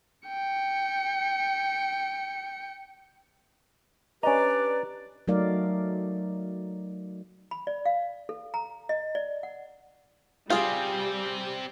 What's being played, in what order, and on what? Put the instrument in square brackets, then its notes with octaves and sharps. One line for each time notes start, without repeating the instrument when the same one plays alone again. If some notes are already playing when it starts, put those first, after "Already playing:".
[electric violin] G5 C#7
[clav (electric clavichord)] C#4 D#5 [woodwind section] D4 G4 D5 [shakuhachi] B4 [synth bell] A#5
[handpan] F#3 A3 D#4 A#4 D5 F5
[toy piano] B5
D5
F5
A4
A#5
D#5
D5
F#5
[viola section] G3 [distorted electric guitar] C4 G4 [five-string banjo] F4 G#4